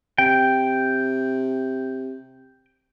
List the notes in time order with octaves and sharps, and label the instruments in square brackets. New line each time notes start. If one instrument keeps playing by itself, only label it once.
[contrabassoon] C3 [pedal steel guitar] G5